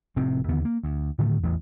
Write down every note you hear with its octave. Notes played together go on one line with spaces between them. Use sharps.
F1 A2 C3 C4
D#2 D3 B3
A#3
D2
A2 D3 D#3 A3
A1 E2